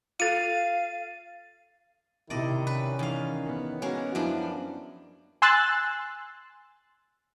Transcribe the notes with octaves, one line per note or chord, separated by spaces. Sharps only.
F4 A4 F5 A6 D#7
C3 D#3 E4 D5 D#5
C#4 B4
E2 D#3 F5
B3
G#3 A#3 C#4 F#4
F#2 F3 D4 E4
G#5 C6 E6 F#6 A6